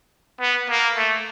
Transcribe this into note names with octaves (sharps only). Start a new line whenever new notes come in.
B3
A#3
A3